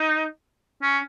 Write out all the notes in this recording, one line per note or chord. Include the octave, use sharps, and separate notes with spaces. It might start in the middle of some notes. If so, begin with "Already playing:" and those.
Already playing: D#4
C#4